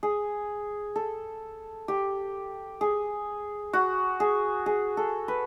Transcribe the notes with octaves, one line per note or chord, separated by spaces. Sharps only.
G#4
A4
G4
G#4
F#4
G#4
G#4
A4
B4